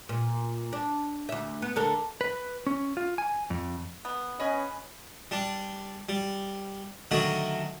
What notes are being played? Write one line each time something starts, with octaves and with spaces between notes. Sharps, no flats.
A#2
D4
D2 E5
B3
D3 A4 A#4
B4
C#4
F4
G#5
F2
B3
C#4 B4 D#5 G#5
G3 D4
G3
D3 D#3 F#3 A3 F#4